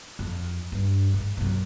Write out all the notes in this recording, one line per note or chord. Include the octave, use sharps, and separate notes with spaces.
F2
G2
G#2
F#2 C3